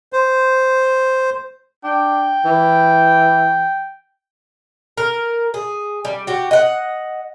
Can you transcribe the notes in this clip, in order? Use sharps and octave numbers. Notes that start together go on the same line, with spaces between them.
C5
D4 G5
E3
A#4
G#4
G3
F#4 G4
D#5 F#5